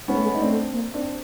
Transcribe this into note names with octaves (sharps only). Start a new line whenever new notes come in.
G#3 B3 C#4
A3
G#3
D#4
A3 C4 D4
A#3
C4 D4